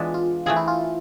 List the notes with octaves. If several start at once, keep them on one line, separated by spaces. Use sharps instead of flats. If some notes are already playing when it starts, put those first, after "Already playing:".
Already playing: E3 G#3 B3 D4 F4
F4
E3 A3 C4 F4 G#4
E4
F4